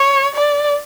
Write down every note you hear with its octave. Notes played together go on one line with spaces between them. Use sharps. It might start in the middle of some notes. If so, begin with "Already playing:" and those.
Already playing: C#5
D5